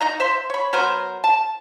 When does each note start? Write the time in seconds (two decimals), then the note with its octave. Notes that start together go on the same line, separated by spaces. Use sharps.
0.01 D#4 D#5 A#5
0.20 C5 E5 C6
0.50 C#5 B5
0.73 F#3 B3 A#4 C5
1.24 A5